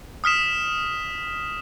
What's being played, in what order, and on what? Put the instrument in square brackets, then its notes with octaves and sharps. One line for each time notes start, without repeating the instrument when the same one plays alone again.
[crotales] D#6 F6 B6 E7